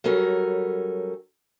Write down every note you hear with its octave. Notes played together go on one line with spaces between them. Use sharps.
F#3 G3 C#4 A4 A#4